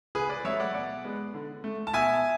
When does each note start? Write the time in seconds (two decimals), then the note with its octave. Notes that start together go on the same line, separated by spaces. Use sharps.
0.15 C#3 G#4 B4
0.29 B4 D5
0.45 F#3 A3 C#5 E5
0.60 D5 F#5
0.74 B2 D5 F#5
1.04 G#3 B3
1.34 D3
1.64 A3
1.87 A5
1.93 B2 E5 G#5